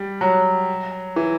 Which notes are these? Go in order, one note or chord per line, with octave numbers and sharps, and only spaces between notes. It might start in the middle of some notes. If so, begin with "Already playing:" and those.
Already playing: G3
F#3
E3